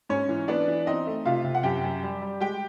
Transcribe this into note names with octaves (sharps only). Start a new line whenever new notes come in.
G#2 C#4 C#5
E3
B3 D4 D5
E3
C4 D#4 D#5
A3
C3 F4 F5
C3
F#5
F#2 G4 G5
F#2
G3
G3
G#3 G4 G5